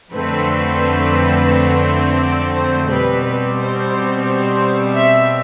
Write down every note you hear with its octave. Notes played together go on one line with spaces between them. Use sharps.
F2 D3 A3 C4 B4
D5
C5
B2 G3 C4 B4
B4
C5
E5